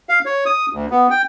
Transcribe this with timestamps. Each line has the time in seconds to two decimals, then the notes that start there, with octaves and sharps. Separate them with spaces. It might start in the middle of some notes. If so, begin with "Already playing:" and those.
0.09 F5
0.25 C#5
0.46 D#6
0.73 D2
0.90 B3
1.10 G5